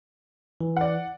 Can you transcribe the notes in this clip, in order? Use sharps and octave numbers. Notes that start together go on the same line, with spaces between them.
E3
D5 F#5